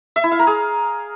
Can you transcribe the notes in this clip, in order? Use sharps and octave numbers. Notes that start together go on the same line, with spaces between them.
E5
E4
F5
A#4
G#4